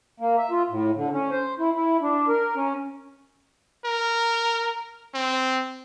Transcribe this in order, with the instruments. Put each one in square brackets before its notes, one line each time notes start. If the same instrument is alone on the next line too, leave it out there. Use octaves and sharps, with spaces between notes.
[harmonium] A#3
E5
F4
A2
D3
C#4
C5
E4
E4
D4
A#4
C#4
[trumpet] A#4
C4